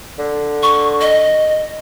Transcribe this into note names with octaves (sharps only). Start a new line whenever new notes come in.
D3
C#6
D#5